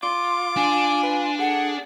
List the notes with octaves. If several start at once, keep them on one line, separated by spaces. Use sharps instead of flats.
F4 D6
D4 G#5
B4
G#4 A4 F#5